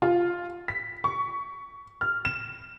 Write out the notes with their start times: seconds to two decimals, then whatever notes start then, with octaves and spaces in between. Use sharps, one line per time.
0.02 F4
0.68 B6
1.04 C#6
2.01 F6
2.25 E7